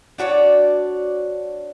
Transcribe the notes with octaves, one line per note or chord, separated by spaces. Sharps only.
D4 F#4 C#5 D5